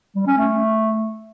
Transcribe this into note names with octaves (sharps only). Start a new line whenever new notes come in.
G3
C#4
A3